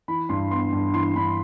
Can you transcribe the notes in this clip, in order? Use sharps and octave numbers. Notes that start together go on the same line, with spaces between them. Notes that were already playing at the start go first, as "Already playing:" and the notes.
E3 B5
G2 C6
B3 C6
G2
E3 C6
G2 B5